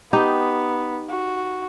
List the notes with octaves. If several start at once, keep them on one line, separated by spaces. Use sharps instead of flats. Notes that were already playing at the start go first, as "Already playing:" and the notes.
B3 D#4 G4
F#4